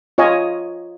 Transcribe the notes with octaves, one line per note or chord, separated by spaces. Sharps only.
F4 C#5 D#5 G#5